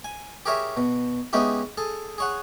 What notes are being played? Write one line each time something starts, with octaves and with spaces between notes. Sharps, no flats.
G#5
G4 G#4 A#4 C#5 E5
B2
G#3 B3 C#4 D#4 E4 G4
G#4 A4
G#4 C#5 F#5